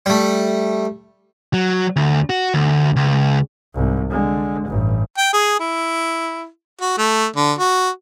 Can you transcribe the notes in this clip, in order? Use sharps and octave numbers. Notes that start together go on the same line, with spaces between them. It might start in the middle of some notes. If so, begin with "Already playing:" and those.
G3 A3
F#3
D2
F#4
D2
C#2
C2 G#2
D3 G#3
A1 G2
G5
G#4
E4
F#4
A3
D3
F#4